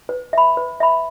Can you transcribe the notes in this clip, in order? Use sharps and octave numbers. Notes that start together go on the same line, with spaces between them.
B4
E5 B5
B4
E5 B5